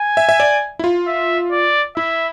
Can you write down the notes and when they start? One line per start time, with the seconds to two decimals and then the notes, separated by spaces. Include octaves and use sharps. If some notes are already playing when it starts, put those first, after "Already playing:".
Already playing: G#5
0.17 E5
0.29 E5
0.40 D5
0.79 E4
0.84 F4
1.07 E5
1.51 D5
1.97 E4 E5